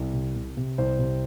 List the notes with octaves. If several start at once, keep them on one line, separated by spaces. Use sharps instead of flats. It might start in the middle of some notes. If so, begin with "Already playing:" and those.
Already playing: C2
C3
C3
C3
C2 C5
C3